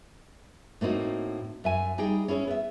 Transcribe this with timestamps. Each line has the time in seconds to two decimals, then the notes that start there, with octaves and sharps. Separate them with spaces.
0.81 A2 A#3 C4 D#4 F#4
1.64 F#2 E5 G#5
1.98 G3 D#4 G#4 G5
2.28 C#4 E4 G#4 C#5
2.47 B3 E5